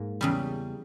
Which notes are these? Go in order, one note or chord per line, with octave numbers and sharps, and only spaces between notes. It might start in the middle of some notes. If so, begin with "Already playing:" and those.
Already playing: G#2 A#3
E2 C#3 G3